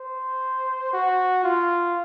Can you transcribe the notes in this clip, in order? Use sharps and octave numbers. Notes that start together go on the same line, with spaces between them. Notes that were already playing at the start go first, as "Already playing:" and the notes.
Already playing: C5
F#4
F4